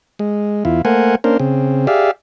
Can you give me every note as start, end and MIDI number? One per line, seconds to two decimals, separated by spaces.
0.19 0.64 56
0.65 0.82 40
0.65 0.82 64
0.65 0.82 65
0.85 1.15 57
0.85 1.15 58
0.85 1.15 70
0.85 1.15 72
0.85 1.15 78
0.85 1.15 80
1.24 1.37 58
1.24 1.37 61
1.24 1.37 62
1.24 1.37 70
1.24 1.37 72
1.40 1.87 49
1.40 1.87 60
1.87 2.11 67
1.87 2.11 68
1.87 2.11 74
1.87 2.11 76
1.87 2.11 77